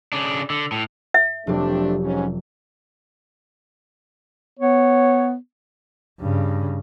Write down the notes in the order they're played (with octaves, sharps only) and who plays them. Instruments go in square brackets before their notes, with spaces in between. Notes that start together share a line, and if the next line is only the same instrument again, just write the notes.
[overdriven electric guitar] C#3 D4
D3
A2
[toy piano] E5
[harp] F1 F#3 G4 [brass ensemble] A3 C4 D4
[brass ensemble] G#2 C#4
[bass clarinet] B3 [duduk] C#5
[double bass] G2 C#3